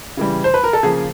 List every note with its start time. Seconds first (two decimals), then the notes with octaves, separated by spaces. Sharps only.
0.17 C#3 E3 G3
0.44 C5
0.54 B4
0.64 A#4
0.73 A4
0.83 C#3 F3 A#3 G#4